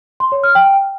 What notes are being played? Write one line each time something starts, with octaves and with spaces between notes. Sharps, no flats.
C6
C#5
F6
G5